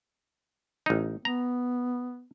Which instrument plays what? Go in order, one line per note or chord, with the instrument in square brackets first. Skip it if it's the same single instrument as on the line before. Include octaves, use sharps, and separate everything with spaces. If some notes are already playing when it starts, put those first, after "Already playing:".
[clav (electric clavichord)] A1 D#4
[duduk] B3 [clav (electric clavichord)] A#5